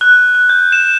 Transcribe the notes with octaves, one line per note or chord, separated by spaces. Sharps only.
F#6
F#6
G6
E7